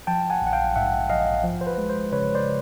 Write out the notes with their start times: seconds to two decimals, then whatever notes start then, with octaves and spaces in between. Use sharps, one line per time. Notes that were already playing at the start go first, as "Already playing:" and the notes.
0.07 F3 G5 A5
0.30 F#5 G#5
0.42 A#1 F#5
0.53 F5 G5
0.76 G#2 E5 F#5
1.10 A#1 D#5 F5
1.44 F3
1.61 C5
1.67 B4
1.78 G#3
1.89 C5
2.12 C#3 B4 C#5
2.35 C5 D5